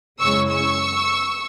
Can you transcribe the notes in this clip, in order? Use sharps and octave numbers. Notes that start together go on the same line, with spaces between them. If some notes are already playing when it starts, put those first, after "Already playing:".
F#2 C#3 G#3 C#4 E4 C#6 E6
C#6 E6